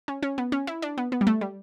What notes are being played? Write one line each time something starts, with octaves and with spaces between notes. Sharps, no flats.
C#4
C#4
B3
C#4
E4
D4
B3
B3
G3
A3
G3